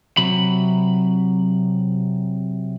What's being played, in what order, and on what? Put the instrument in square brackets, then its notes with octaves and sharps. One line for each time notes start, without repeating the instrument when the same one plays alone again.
[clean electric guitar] C3 F#3 B5